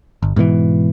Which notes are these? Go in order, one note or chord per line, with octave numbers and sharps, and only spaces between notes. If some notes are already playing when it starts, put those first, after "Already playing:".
G1
G#2 B2 D3 E3